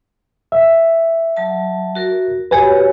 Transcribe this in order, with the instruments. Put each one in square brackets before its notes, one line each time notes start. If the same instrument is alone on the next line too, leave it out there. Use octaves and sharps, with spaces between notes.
[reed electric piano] E5
[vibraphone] F#3 A5
F#4 A#4
[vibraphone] F#4 G4 C#5 [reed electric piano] B4 G#5